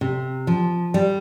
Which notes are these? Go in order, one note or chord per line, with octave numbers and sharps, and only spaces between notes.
C3
F3
G3